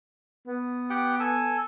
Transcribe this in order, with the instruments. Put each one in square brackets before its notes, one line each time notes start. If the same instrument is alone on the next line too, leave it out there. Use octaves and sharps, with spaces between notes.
[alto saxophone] B3
[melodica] G4 F#5 G5
A4 G#5 E6